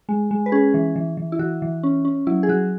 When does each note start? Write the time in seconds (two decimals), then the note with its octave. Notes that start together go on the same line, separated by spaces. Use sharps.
0.09 G#3
0.31 G#3
0.46 B4
0.52 C#4 G#4
0.74 E3
0.96 E3
1.17 E3
1.32 E4
1.39 E3 F#4
1.62 E3
1.83 C#4
2.05 C#4
2.27 F#3 E4
2.43 G#4
2.49 F#3 F#4